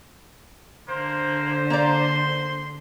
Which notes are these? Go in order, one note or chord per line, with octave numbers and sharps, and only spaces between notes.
D3 A#3 C5
A#3 A#4 D5 C6